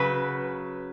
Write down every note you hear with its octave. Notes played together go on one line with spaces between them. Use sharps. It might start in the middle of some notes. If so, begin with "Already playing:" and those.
Already playing: C#3 F#3 B4